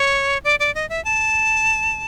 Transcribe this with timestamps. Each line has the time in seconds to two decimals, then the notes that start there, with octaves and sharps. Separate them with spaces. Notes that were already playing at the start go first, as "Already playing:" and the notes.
Already playing: C#5
0.44 D5
0.59 D5
0.75 D#5
0.89 E5
1.05 A5